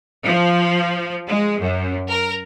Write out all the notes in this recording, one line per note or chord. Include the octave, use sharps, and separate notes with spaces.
F3
G#3
F#2
A#4